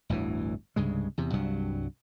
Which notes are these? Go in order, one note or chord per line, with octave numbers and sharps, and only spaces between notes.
G1 D2 A2 E3
C2 G2 C#3 G#3
E2 C3
C2 G2 F#3